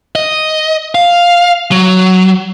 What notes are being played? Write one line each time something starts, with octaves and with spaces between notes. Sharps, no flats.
D#5
F5
F#3